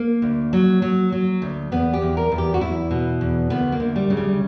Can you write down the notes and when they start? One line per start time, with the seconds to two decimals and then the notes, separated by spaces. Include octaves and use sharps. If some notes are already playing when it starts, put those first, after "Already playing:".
Already playing: A#3
0.22 D2
0.53 F#3
0.82 F#3
1.12 F#3
1.42 D2
1.72 E2 B3
1.93 G4
2.02 E2
2.17 A#4
2.32 E2
2.38 G4
2.54 F#4
2.61 E2 E4
2.91 B2
3.21 E2
3.50 D2 B3
3.72 A#3
3.80 D2
3.96 G3
4.10 C#3
4.17 G3